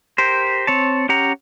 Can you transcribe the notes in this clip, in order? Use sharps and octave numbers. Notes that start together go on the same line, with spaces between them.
G4 A#4 C5
C4 C#5 A5
C#4 G4 F#5 A#5